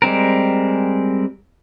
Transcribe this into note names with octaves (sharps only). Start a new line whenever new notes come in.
G3 G#3 C4 A#4